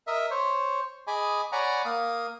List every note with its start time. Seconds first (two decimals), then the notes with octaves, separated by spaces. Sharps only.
0.07 A#4 D#5 E5
0.31 C5 C#5
1.07 G#4 D#5 G#5 B5 D6
1.52 C#5 D5 F#5 G#5 A#5 B5
1.85 A#3 F5 D#6